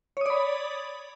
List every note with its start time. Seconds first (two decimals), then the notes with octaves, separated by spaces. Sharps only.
0.17 C#5
0.21 D#6
0.26 D5
0.30 B5